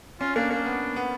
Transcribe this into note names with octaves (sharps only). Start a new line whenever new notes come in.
C#4 F4
A#3 D4
A#3 D4
B3
B3